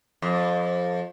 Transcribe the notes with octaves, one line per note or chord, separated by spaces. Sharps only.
F2